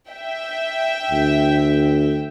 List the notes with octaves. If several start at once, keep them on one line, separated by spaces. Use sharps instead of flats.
E5 G5
D2